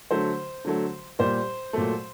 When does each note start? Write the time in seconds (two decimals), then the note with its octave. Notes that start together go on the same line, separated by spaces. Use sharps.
0.11 D3 F#3 A3 C5
0.65 D3 F#3 A3
1.19 A#2 G3 C5
1.73 A#2 F#3 A3